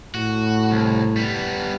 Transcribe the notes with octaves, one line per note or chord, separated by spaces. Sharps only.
A2 F#4
C2
G3 B3